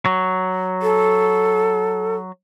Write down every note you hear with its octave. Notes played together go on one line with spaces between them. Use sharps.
F#3
A4